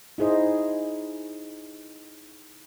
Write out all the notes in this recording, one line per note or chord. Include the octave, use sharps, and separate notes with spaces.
D#4 E4 G#4 C5 D#5